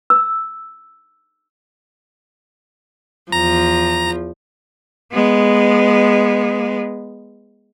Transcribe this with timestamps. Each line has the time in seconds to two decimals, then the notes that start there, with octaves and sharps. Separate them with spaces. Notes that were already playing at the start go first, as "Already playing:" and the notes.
0.10 E6
3.32 E2 F3 A#5
5.12 G#3 B3